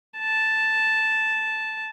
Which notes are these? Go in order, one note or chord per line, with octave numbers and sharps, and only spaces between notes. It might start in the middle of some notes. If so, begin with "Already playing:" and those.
A5